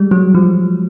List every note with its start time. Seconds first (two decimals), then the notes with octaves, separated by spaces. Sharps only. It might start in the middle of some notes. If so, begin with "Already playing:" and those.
Already playing: G3 G#3
0.11 F#3
0.35 F3